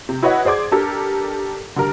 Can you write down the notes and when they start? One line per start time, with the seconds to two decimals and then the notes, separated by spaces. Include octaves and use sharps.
0.09 C3
0.23 E4 F#4 B4 C#5 D#5 F#5
0.45 G#4 C5 D5 D6 G#6
0.72 D4 G4 A4 A#4
1.76 D3 G3 A#4